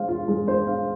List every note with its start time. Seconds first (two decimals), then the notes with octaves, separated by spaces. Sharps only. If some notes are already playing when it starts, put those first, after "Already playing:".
Already playing: G#3 C5 F5
0.08 F4
0.28 G#3
0.48 C5
0.67 F5